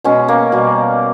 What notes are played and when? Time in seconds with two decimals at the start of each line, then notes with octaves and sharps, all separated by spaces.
0.04 B2 G#3 C#4
0.28 A#3
0.52 B2 G3